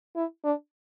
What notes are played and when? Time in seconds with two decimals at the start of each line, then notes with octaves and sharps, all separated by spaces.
0.16 E4
0.44 D4